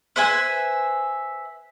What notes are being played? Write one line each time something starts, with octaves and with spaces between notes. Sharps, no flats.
B4 C5 E5 G#5